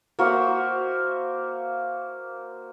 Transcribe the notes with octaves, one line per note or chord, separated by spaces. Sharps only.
A#3 F#4 C5 E5